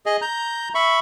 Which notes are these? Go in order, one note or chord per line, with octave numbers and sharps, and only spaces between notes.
G#4 D#5
A#5 G6
E5 B5 C#6